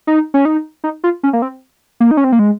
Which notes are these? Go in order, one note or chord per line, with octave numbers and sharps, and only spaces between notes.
D#4
C#4
D#4
D#4
F4
C#4
A#3
C4
A#3
D#4
C#4
C4
A#3
G#3